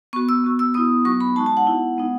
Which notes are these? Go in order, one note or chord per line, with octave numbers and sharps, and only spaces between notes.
B3 F#4 C#6
E6
B3 F#4
E6
B3 E4 D#6
F#3 B3 D#4 F#4 C#6
B5
G#3 D#4 F#4 A5
A5
F#5
B3 E4
G#3 B3 D#4